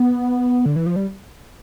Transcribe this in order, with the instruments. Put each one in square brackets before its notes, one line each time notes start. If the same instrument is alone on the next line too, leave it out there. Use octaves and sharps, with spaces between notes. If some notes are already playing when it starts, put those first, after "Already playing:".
Already playing: [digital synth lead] B3
D3
E3
F3
G3